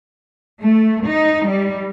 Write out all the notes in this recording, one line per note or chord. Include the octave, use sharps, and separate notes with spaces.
A3
D#4
G3